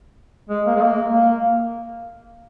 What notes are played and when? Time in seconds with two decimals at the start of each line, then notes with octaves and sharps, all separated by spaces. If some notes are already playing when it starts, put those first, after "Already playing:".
0.49 G#3
0.66 A#3
0.75 G#3
0.82 A#3
1.13 A#3